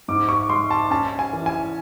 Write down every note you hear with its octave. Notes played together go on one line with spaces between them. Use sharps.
G#2 D6
C#6
G#3 C6
A5
C#4 A5
G#5
E3
G#5